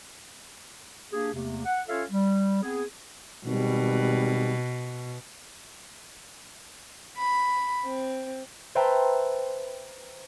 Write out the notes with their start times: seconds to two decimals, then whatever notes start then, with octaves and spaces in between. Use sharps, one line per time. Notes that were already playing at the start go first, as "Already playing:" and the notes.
1.12 A#3 D4 G4 G#4
1.33 E2 C3 A3 A#3
1.66 F#5
1.88 C#4 F4 A4 C#5 E5 F5
2.11 G3
2.63 B3 C4 G#4
3.46 G#1 B2 G3
7.18 B5
7.86 C4
8.75 B4 C5 E5 G5 A5 A#5